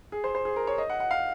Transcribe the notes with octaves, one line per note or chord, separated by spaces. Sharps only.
G#4
C5
C5
G#4
A#4
C#5
D#5
F#5
F#5
F5